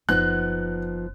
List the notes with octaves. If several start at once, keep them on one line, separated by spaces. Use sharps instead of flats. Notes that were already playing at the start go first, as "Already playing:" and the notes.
F#1 F3 B3 D#4 F#6